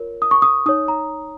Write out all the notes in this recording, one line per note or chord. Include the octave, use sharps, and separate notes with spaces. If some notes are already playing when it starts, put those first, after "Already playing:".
Already playing: F4 A#4 C#5
D#6
C#6
D#6
D#4 C#5 D#6
A#5